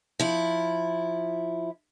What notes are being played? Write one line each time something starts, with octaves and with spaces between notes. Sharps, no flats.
F3 E4